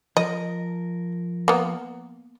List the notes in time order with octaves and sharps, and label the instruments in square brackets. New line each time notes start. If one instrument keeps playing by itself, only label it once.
[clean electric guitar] F3 A#4 [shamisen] D#5
[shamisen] A#3 B3